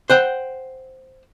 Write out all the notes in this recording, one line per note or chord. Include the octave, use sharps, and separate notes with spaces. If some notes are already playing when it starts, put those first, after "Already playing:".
C5 F#5 G5